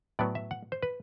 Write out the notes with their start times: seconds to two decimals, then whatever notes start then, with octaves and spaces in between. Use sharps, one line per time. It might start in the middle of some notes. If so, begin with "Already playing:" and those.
0.19 A2 F#3 B3 D5
0.35 E5
0.51 F#5
0.72 C5
0.83 B4